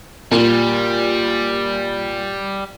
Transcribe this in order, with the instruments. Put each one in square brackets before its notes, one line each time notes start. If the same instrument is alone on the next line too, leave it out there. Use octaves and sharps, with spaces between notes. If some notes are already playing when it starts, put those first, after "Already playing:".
[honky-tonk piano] A#2 [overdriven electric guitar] G3